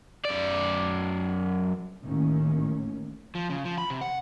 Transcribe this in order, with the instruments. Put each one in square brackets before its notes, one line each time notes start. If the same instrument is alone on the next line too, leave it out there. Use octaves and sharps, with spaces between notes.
[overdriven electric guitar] F#2 D5
[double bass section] A1 D#2 A2 D#3 C#4
[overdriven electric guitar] F3
C#3
F3
B5
C3
F#5